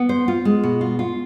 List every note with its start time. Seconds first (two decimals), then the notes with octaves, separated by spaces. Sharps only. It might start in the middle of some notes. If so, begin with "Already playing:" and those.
Already playing: B3
0.09 C5
0.28 F4
0.45 G#3
0.63 B2
0.81 F4
0.99 F4